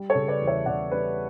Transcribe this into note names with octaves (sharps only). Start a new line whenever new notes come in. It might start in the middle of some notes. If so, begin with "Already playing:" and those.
Already playing: G3
A4 C#5
C#3
B4 D5
E2
C#5 E5
C#3 D5 F#5
G3 B4 D5